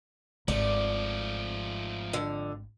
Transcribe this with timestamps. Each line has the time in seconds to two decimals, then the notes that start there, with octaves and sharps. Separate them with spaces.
0.48 G#1 F3 A3 D5
2.13 F2 D3